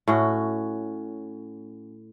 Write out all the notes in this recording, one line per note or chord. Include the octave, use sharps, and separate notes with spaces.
A2 C#4 F#4